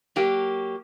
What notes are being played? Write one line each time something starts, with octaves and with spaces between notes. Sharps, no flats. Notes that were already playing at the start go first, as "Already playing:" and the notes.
F#3 A#3 G4